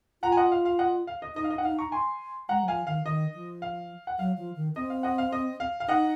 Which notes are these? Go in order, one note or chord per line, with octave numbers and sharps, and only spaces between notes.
F4 F#5 A#5
G#5
D#5 F#5
F5
F5
D#5 F#5
F5
D#5
D#4 D#5
F5
D#5
F#5
D#4 F5
A#5 C#6
G#5 C6
G#3 F#5 A#5
F#3
F3 F5 G#5
D#3 F5
D#3 D#5
F3
F5
F#5
F#3 F5
F3
D#3
C4 D#5
F5
D#5 F#5
F5
D#5
F5
F5
D#4 D#5 F#5